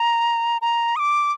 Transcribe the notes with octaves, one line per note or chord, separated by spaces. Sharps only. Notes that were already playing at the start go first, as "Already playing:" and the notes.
Already playing: A#5
A#5
D#6
D6